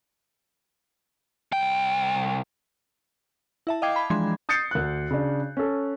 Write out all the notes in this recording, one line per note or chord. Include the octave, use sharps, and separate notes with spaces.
C2 G5
E4 E5 A5
D#5 F5 G5 D6 G#6 C7
B5
E3 F3 G#3 D4 C6 G#6
D#6 G6 A6 C7 C#7
D2 F#6
C#3 D4
C#4 A4